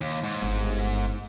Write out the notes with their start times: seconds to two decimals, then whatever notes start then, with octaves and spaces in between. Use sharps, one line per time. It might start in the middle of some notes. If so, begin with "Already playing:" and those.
0.01 D#2
0.24 G#2
0.42 G1